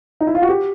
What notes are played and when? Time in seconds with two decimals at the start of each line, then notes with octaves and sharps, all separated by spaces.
0.21 D#4
0.27 E4
0.35 F4
0.42 F#4
0.49 G4